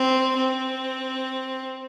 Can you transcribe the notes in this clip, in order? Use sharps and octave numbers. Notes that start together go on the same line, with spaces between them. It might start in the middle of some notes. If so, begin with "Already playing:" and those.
Already playing: C4
C4